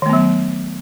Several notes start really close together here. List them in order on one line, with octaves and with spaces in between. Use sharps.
D#3 A3 B3 F#3